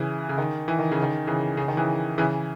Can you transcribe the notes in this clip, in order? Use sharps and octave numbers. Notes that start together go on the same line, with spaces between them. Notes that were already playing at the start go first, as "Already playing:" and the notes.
Already playing: C#3 E3
C#3
D#3
E3
D#3
C#3
D#3
C#3 E3
C#3
D#3
C#3 E3
C#3 E3